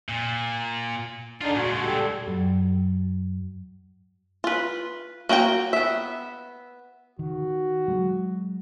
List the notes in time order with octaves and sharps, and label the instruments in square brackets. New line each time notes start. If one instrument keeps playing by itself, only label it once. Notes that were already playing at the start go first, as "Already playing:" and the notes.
[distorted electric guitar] A#2
[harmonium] D3 D4 D#4 [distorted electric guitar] F4 G#4
[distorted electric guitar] A#2 G#3 [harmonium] F#4
[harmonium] G3 A4
[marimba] F#2 F#3
[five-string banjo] F4 B4
A#3 F#4 D#5 G5
B3 E5
[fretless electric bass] D#3 [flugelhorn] F#4
[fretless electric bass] F#3 G#3